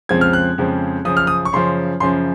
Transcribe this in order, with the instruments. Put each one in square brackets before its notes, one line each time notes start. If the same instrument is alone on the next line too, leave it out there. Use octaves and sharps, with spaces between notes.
[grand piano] F2 C#3 F3 G#3 C4 G#6
F6
F#6
F2 C#3 F3 G#3 C4
F#2 C#3 F3 D#6
F6
D#6
C#6
F#2 C#3 F3 C6
F#2 C#3 F3 C6